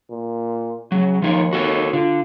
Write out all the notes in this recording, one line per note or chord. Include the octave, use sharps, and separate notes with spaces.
A#2
C#3 F#3
D#2 F3 D#4 C#5
F#4 A4 C#5
D3 F4